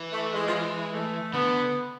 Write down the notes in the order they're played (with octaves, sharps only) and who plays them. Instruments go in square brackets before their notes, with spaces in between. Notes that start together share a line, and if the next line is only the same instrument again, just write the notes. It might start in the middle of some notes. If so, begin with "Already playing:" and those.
Already playing: [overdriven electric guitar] E3
[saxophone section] A3
G#3
F3
G#3
A3
[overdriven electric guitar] D3 [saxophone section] B3